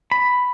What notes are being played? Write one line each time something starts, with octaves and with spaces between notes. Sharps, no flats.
B5